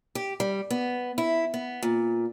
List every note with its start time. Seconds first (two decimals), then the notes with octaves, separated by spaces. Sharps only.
0.15 G4
0.40 G3
0.70 B3
1.18 E4
1.54 B3
1.82 A#2